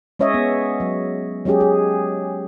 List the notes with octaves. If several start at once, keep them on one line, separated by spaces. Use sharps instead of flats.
G#3 C#4 C#5 D#5 E5
B3
F#3
F#3 G#3 C#4 G4 G#4
G#4